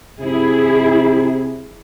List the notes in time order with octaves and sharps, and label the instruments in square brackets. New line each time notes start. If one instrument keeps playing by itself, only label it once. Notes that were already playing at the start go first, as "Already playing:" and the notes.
[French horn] C3 [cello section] E4 G#4